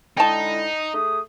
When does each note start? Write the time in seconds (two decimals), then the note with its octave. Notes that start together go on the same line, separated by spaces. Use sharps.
0.17 D3 G#3 D#4 E4 G5 A5
0.94 A3 G#4 D#6